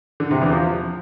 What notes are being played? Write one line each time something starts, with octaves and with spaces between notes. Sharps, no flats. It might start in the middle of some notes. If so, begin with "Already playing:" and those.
D3
C3
E2
F3